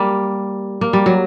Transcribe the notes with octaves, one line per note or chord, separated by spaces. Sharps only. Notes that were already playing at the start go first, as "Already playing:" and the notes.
Already playing: G3 A#3
A#3
G3
F#3